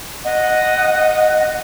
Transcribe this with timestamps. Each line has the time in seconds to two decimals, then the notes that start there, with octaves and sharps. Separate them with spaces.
0.24 D#5 F#5